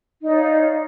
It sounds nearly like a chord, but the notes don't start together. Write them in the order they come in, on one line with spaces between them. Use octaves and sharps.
D#4 D5 C#5 F5